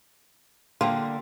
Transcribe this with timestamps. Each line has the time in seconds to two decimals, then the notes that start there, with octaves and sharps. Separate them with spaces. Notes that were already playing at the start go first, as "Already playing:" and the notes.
0.81 D3 G3 A#3 F4 G4